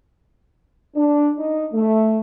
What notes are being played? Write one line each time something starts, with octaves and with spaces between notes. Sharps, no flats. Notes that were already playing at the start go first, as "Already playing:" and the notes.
D4
D#4
A3